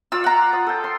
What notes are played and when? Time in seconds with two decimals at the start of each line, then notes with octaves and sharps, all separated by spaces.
0.12 F4 D5 E6
0.24 F#5 A#5
0.53 D#6
0.67 A4 G5
0.84 C6